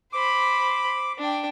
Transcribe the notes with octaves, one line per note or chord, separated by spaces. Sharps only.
C5 B5 D6
D4 G5